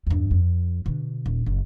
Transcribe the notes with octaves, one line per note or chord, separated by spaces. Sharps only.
E2 G2
F2
B2 D3
D#1
F#1